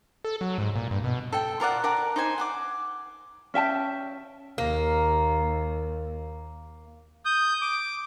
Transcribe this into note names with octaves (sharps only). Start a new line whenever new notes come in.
A4
F#3
G#2
A#2
G2
B2
A4 G5
F4 A#4 D5 F#5
A#4 D5 F#5 A5
D#4 C5 G#5
F#5 G#5 D6
C#4 E5 G5 A5
D#2 A#3
D#6 G6
D6